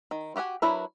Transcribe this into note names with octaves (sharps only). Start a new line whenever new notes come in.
D#3
F#4 G4 F#5 G#5
F#3 D4 E4 A#4 B4